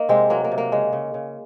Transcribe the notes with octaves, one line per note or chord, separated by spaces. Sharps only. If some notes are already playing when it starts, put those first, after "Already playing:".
Already playing: A#3 D#4
C3 G#3 C4
F#3 A#3
A#3
C3
A#3
C#3 G#3
C#3
C#3